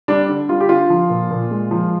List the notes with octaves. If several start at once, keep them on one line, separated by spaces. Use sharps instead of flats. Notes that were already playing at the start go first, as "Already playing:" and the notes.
G3 D4 D5
D3
G3 F4
G4
D3 F4
F3
A#2
A#2
G#3
F3